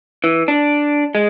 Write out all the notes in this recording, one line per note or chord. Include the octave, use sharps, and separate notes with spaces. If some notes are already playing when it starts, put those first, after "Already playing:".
E3
D4
G#3